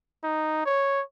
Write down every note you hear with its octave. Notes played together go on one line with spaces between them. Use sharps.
D#4
C#5